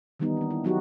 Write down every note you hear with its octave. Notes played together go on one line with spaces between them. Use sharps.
D#3 E3 G3 B3 D#4
A#3 D4
E4
F#3 D#4 F#4 G4